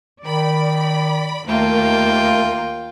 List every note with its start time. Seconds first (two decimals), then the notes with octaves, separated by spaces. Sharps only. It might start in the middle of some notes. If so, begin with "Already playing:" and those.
0.24 D#3 D5 B5
1.48 D#2 A3 A#3 F4 G5